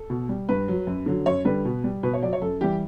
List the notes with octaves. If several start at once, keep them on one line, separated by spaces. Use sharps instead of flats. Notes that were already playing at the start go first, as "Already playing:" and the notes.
Already playing: A4
B2
G3
G2 B4
F#3
F#2
D3 F#3
F#2 C#5
D3 G3 B4
B2
G3
B2 B4
C#5
F#3 D5
C#5
F#2 A4
E3 G3 G4